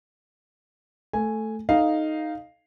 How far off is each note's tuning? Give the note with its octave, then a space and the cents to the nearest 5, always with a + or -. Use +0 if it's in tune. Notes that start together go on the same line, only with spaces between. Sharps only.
A3 +0 G#5 +0
D#4 +0 A4 -20 F5 +0